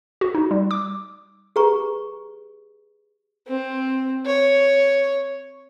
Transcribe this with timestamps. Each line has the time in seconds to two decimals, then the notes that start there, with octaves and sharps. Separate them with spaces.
0.21 F#4
0.35 D#4
0.51 G3
0.71 D6
1.56 G4 G#4 B4 A#5 C#6
3.48 C4
4.26 C#5